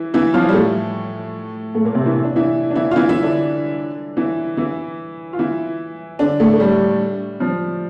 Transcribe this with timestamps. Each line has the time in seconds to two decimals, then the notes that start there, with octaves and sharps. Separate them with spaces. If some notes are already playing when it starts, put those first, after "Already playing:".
Already playing: E3 E4
0.14 E3 E4
0.34 F3 F4
0.49 G3
0.53 A2 A3
1.74 A2 A3
1.85 A#2 A#3
1.95 C3 C4
2.06 E3 E4
2.24 D4
2.36 E3 E4
2.70 D4
2.75 E3 E4
2.91 F4
2.96 E3 E4
3.09 E3 E4
3.23 D3 D4
4.17 E3 E4
4.57 E3 E4
5.33 F4
5.39 E3 E4
6.19 D3 D4
6.40 A2 A3
6.53 A3
6.60 G3
7.40 F3